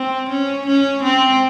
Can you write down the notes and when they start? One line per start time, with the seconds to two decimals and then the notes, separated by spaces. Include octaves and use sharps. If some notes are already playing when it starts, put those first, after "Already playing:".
Already playing: C4
0.29 C#4
0.66 C#4
1.03 C4